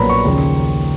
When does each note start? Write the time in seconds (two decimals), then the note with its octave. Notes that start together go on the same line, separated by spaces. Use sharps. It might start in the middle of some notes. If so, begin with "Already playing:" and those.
Already playing: B1 A#2 F3 A#3 B4 C#5 A#5 B5
0.09 C#6
0.24 D#2 C#3 F3